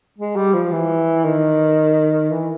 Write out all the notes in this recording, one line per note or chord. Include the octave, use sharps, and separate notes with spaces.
G#3
G3
F3
E3
D#3
E3